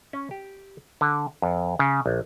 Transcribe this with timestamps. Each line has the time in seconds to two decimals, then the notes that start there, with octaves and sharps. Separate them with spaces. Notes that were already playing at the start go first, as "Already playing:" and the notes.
0.13 C#4
0.31 G4
1.01 D3
1.42 F2
1.79 C#3
2.06 A#1